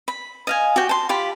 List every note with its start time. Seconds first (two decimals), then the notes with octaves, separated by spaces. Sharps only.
0.08 B5
0.47 D#5 F5 G#5
0.76 F#4 G4 G5
0.89 A5 C6
1.09 F4 G4 B5